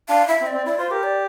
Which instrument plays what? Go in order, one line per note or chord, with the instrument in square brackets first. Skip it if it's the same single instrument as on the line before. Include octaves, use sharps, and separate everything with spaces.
[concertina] D4 [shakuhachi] F5
[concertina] E4 [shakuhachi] E5
[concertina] C4
[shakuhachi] D5
[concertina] C4
[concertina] E4 [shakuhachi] D5
[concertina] F4 [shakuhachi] C5
[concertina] G4 [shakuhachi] A#4
[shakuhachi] D5